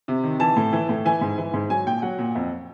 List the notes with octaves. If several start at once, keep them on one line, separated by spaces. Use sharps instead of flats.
C3
D#3
E3 A5
A2
E3
A2
E3 G#5
G#2
E3
G#2
F#3 G#5
A#2 G5
F#3 F#5
A#2
F2